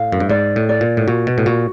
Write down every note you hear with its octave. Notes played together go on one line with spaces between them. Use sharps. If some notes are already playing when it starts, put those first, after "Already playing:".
Already playing: A2 F5
F#2
G2
G#2 D5
A2
D5
A#2
A2
A#2 F#4
B2
A2
A#2 F#4